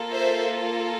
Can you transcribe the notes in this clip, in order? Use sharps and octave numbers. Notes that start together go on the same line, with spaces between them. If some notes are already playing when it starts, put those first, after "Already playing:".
Already playing: A#3 F4 A4
C5 E5